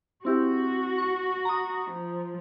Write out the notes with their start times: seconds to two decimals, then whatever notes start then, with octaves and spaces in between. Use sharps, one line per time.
0.25 C4 E4 F#4 G4
0.98 C#6
1.45 A#5 D#6
1.91 F3